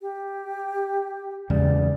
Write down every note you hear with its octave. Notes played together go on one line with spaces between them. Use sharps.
G4
E2 C#3 G#3 D5